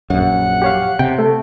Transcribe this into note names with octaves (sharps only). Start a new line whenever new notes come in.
A#1 F#2 F#5
G4 C#5 F5
C3 G5
A3